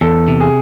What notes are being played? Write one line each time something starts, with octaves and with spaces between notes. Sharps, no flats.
E2 A4
C3
G#4